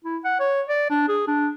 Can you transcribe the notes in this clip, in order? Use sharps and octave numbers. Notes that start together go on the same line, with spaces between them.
E4
F#5
C#5
D5
D4
G#4
D4